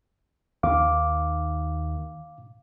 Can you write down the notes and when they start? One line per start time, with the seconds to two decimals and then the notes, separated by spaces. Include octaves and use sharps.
0.63 D#2 D#3 F5 D6